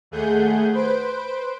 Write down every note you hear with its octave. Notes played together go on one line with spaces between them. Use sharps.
D#2 A3 G#4 F#5 G6
B4 C5 D7